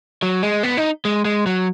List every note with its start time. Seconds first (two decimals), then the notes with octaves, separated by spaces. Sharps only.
0.23 F#3
0.43 G#3
0.63 B3
0.77 D#4
1.05 G#3
1.25 G#3
1.46 F#3